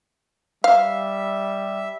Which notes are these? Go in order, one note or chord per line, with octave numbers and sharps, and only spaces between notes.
G3 E5 F5